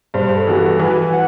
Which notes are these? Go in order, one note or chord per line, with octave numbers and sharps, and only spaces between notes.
G2 C5
A4
E3 B3 F#4
A4
E3 B4
F#5